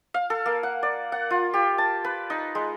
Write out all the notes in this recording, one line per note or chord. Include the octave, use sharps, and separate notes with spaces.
F5
A4
A#3
F#5
D5
F#5
F4
G4
A5
B4
D#4
G#3